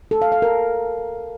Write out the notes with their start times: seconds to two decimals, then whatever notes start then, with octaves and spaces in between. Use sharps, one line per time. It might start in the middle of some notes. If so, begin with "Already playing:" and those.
0.11 A4
0.22 F5
0.32 F5
0.42 A#4